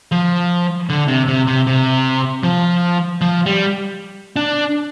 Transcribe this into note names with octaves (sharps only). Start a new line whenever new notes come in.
F3
D3
C3
C3
C3
C3
F3
F3
G3
D4